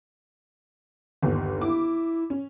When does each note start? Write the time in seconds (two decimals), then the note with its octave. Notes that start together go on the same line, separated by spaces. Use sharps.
1.22 G1 D#2
1.61 E4 D6
2.30 C#4